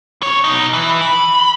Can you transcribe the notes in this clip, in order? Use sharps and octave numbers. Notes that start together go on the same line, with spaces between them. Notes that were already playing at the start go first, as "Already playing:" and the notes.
F2 C#5
B2 D#4
E3
B5